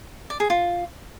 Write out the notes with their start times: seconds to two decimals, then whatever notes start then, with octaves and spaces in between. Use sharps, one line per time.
0.30 D5
0.40 G#4
0.50 F4